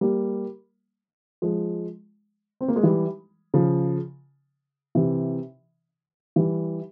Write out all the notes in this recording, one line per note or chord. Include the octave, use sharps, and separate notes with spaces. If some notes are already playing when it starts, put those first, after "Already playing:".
G3 A#3
F3 G#3
C4
A#3
G#3
E3 G3
C#3 F3
C3 E3
E3 G3